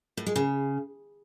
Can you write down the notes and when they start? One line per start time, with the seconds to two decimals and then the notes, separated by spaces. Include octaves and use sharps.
0.17 A2
0.26 G#3
0.36 C#3